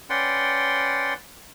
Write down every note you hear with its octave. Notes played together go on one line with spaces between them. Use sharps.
C#4 B4 D5 F#5 G5 C6